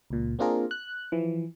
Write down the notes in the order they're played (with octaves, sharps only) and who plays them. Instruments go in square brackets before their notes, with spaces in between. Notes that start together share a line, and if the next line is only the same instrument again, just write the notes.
[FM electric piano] C#2 A#2
A#3 C4 D4 F4 G#4 A#4
F#6
E3 F3